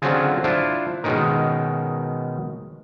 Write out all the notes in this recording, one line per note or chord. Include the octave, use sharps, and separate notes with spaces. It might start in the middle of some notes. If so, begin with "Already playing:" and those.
D3 F#3 C4 C#4 F4 G#4
D4 E4 F4 C5
B2 D#3 G#3 C#4 D#4 A#4